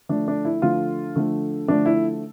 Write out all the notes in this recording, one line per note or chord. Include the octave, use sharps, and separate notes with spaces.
D3 F3 A3 D4
D4
E4
D3 F3 A3 F4
D3 F3 A3
D3 F3 A3 D4
E4